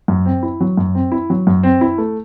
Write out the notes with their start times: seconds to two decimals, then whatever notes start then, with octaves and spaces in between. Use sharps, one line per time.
0.08 F#2
0.26 C4
0.43 E4
0.60 F#3
0.77 F#2
0.95 C4
1.12 E4
1.30 F#3
1.47 F#2
1.63 C4
1.81 E4
1.98 A3